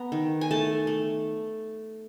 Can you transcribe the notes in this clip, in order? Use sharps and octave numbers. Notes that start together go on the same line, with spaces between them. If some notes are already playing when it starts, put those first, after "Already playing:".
Already playing: B3 A#5
D#3
G#5
A3 A5
A3